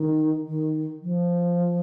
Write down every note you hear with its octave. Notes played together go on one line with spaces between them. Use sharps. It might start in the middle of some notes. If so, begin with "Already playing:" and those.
Already playing: D#3
D#3
F3